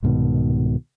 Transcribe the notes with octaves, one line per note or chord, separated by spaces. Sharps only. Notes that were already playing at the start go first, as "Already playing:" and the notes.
C2 G#2 B2 D#3